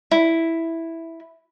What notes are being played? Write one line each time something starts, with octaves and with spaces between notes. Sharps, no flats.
E4